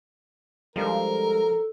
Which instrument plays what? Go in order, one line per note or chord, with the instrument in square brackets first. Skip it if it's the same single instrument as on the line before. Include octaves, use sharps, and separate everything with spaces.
[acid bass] F3 [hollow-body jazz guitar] G3 G#3 D4 [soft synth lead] A4 [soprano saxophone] A#4